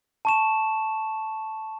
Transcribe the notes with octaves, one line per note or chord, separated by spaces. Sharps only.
A5 C#6 E7